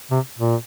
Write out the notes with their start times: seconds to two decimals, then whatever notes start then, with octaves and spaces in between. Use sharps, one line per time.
0.11 C3
0.39 A#2